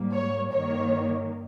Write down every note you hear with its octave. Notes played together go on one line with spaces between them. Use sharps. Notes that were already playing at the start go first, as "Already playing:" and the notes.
Already playing: G#2 G3 A#3
C#5
G2 D#3 A#3 C#5